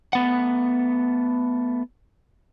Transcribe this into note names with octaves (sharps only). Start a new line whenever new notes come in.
A3 B3 F#5